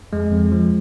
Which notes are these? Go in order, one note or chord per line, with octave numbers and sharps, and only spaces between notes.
F2 G#3
F2
F3